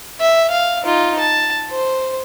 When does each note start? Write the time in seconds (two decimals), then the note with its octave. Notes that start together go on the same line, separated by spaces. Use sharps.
0.21 E5
0.51 F5
0.83 D#4 F4
1.19 A5
1.71 C5